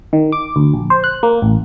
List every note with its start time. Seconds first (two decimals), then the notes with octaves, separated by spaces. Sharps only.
0.13 D#3
0.32 D6
0.56 D2
0.74 A#1
0.90 C5
1.04 F#6
1.23 A#3
1.42 A1